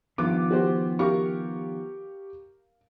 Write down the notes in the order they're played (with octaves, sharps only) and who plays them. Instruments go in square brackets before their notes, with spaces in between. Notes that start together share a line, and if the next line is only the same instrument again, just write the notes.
[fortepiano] G2 [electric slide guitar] D#3 F3 B3 [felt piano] D6
[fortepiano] F#4 G4 C5
[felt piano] G4 C#6 [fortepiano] A#4 F5